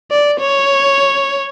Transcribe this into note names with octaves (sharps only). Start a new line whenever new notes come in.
D5
C#5